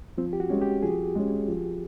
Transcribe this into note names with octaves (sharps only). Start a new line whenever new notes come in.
F3 C4
G4
F#4
G#3 C#4
G4
F3 G#4
G#3 C#4
F3